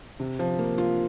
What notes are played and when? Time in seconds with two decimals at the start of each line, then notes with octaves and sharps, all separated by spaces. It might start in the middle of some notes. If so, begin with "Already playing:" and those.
0.20 C3
0.39 F3
0.59 A#3
0.78 F4